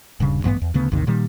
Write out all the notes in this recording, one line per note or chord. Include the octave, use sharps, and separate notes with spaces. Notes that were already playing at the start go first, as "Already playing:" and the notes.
D#1 G2 C#3
A1 G2 A3 B3
E2
D2 C#3 B3
A1 D#2 C3 D#3
A#2 D#3 G3